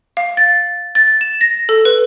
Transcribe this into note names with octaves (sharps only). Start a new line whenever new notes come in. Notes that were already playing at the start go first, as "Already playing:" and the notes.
F5
A6
A6
E7
A#6
A4
B4